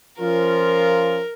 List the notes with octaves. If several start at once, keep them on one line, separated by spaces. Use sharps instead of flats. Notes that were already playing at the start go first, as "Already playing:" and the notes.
F3 C#4 F4 A#4